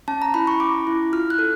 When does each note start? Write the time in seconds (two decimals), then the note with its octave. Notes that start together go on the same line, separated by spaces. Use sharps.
0.08 C#4 A5
0.22 A#5
0.34 E4 B5
0.47 C#6
0.60 C#4 D6
0.87 E4
1.13 F4 F6
1.30 F#6
1.39 A4